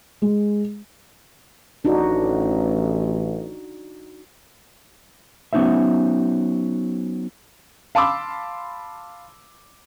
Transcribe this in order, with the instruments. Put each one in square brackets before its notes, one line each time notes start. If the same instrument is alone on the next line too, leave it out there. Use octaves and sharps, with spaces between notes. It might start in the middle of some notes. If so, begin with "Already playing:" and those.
[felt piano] G#3
[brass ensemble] A1 [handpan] D4 D#4 F#4
[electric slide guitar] F#3 B3 C#4 D#4 C5 E5
[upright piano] F5 A5 B5 C6 D6 E6